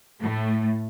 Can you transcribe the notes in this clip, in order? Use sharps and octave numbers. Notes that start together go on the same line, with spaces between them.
A2 A3